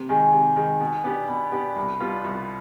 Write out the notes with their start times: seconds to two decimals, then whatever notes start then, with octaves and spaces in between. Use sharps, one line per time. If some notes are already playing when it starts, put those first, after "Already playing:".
Already playing: C3
0.09 D#3 G#3 G#5
0.20 G#5
0.32 C3
0.56 D#3 G#3
0.80 B2
1.04 B3 D4 G4
1.28 B2 B5
1.52 B3 D4 G4
1.76 C2 B5
2.00 B2 G3 B3 F4
2.24 C2